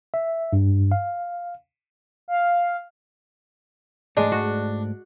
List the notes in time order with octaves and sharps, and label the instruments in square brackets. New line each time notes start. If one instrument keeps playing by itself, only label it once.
[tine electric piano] E5
G2
F5
[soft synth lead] F5
[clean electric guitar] G#2 A3 D5 [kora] G#3 [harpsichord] D4
[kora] F#4